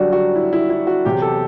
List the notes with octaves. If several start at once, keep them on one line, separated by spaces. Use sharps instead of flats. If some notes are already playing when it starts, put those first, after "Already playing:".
Already playing: F#2 D3 G3 D4 F#4
F#4
E4
E4
E4
F#4
E2 C3 F#3 G4
A4